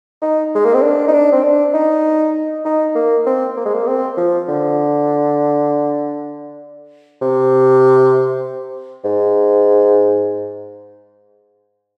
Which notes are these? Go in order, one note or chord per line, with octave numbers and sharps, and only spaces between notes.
D#4
G#3
A#3
C4
D4
D#4
D4
C4
D4
D#4
D#4
A#3
C4
A#3
G#3
A#3
C4
F3
D3
C3
G#2